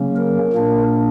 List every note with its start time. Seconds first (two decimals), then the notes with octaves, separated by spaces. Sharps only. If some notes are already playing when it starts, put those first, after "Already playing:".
Already playing: C#3 F#3 A#3 C#4
0.16 A#4
0.53 A#2 A#3 D4